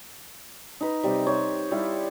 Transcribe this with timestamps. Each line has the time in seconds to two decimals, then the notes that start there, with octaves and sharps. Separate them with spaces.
0.81 D#4 B4
1.03 C3 G3
1.27 C5 C#5
1.71 G3 E4 F5